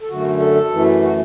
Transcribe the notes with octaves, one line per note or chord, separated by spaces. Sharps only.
A4
F#2 D3 A3 F#4
A4
F#2 E3 A3
F#4